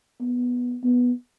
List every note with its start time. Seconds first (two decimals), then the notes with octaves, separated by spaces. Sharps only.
0.21 B3
0.84 B3